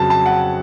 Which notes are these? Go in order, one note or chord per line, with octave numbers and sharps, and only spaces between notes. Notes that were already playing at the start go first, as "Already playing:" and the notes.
Already playing: F2 C#3 F#3 A5
A5
F#5